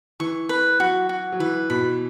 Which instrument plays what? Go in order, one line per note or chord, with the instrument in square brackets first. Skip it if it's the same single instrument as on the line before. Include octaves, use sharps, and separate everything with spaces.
[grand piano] E3 [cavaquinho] C#6
[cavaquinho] B4
[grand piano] F#3 [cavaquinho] F#4
[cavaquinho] F#4
[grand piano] F#3
[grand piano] E3 [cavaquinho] B4
[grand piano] B2 [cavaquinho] B5